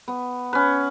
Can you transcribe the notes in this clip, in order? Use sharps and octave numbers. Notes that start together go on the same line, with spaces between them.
B3
C#4 B4